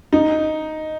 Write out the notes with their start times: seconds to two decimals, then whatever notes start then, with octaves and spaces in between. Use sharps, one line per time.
0.13 D#4